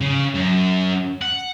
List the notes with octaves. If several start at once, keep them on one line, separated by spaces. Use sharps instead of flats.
C#3
F#2
F#5